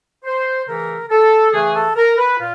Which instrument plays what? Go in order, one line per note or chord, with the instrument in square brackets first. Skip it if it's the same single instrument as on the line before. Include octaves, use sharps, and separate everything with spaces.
[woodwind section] C5
C#3 E3 A3 A#4
A4
C#3 E3 A3 G#4
A4
A#4
B4
A#2 F4